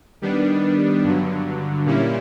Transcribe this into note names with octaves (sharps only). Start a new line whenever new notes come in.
D#3 G3 B3 D4
G2 D3 F#3
A#2 G3 A#3 C#4 E4